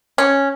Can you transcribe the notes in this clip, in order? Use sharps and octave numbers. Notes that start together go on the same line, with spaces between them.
C#4